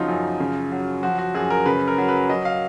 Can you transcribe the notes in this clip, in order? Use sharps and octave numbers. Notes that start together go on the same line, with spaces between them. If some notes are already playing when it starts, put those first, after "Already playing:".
Already playing: C#3 F3 F#3 D#4 F4
F#2
C#3
F#3
F3 F#4
F#4
F#2 G#4
A#4
C#3 B4
A#4
F#3
B4
F#3 D#5
F5